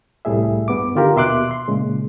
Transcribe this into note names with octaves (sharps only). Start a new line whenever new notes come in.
C2 A2 G3 G#4 E5
G2 B3 D6
D3 D#3 F4 G4 A#4
D#2 B2 E5 C6 D6 F#6
C6
A#2 C#3 G#3